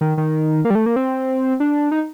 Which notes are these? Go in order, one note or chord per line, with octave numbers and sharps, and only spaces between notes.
D#3
D#3
A#3
G3
A3
A#3
C4
D4
D#4